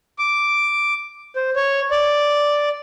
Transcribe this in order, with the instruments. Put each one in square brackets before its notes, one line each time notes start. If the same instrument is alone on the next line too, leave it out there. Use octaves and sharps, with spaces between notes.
[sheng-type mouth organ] D6
C5
C#5
D5